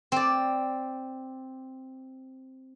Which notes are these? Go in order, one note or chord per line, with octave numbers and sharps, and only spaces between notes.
C4 D5